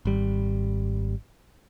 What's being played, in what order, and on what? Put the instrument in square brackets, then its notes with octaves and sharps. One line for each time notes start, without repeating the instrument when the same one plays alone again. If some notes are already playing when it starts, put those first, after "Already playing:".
[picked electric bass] G#1 G3